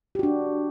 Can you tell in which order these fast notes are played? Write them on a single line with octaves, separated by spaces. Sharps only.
G4 F#4 D4